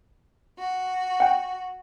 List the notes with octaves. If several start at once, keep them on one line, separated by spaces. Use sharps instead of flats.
F#4
F#5 G5